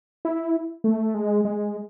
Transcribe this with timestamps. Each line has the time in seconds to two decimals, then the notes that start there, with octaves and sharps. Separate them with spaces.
0.25 E4
0.84 A3
1.14 G#3
1.45 G#3